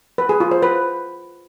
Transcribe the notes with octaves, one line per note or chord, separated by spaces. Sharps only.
B4
G#4
F4
C5
B4